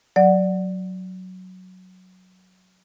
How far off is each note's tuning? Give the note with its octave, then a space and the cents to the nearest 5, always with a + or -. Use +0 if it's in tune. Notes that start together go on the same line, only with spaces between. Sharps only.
F#3 +0 D5 +0 F#5 +0